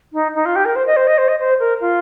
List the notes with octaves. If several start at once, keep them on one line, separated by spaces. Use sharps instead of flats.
D#4
D#4
F4
G4
A#4
C5
D#5
C5
D#5
C5
D#5
C5
A#4
F4